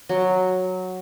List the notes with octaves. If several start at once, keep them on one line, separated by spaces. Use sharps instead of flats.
F#3